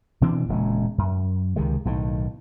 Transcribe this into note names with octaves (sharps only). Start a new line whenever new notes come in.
B2 E3 C4 D4
E1 A#2 C#3 G#3
F#2
C#2 C3 D#3 G#3
B1 A2 D#3